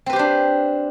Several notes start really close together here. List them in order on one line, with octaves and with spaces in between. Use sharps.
C4 B4 G4 C5 D4